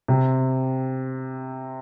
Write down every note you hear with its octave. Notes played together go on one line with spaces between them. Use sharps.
C3 C4